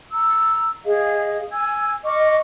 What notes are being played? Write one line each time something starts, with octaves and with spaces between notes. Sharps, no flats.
A#5 E6
G#4 D#5 F5
G#5 E6 G#6
D#5 C#6 D6 F6